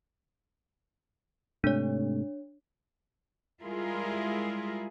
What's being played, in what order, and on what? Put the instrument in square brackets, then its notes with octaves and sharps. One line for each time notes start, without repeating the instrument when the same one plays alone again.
[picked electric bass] G#2 C3 A3 [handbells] D4 C#5
[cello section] G3 G#3 E4 F4 G#4 A#4